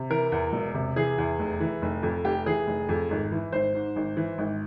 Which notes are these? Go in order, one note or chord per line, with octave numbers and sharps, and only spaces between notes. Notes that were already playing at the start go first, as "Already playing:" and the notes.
Already playing: C3
E3 A#4
E2
E1
C3
E3 G#4
E2
F1
E3
F1
F2
F1 G4
E3 G#4
F1
F2
G#1
E3
G#1 C5
G#2
G#1
E3
G#1